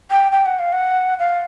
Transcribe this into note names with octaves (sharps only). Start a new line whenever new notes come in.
G5
G5
F#5
F5
F#5
F5